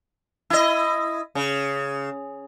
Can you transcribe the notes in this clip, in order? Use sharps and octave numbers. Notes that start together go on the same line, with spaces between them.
E4 D#5
C#3